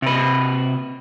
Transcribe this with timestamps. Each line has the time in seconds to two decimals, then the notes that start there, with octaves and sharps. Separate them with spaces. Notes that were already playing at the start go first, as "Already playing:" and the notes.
0.02 C3 B4